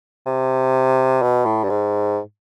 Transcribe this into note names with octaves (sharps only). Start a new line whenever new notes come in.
C3
B2
A2
G2
G#2